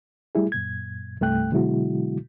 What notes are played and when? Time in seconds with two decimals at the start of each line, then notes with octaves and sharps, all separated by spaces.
0.35 G3 A3 E4 G#4
0.52 F#2 A#2 G#6
1.21 C2 G2 A3 G5 F#6
1.52 B2 D3 F#3 G#3 E4 F#4